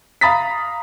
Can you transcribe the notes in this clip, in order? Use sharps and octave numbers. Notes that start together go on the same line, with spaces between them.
F5 A#5 B5 D#6 A6 B6